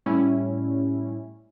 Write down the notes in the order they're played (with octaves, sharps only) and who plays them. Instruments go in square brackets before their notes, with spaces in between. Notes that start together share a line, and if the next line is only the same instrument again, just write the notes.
[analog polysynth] A2 G3 C#4 E4